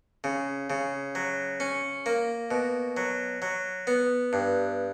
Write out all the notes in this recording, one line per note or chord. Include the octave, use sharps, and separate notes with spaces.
C#3
C#3
F#3
C#4
A#3
B2
F#3
F#3
B3
G2